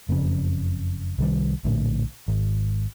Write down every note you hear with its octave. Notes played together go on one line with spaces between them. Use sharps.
F#1 F2 G#2 C#3
C2 D#3 G3
A#1 A2 D3
G#1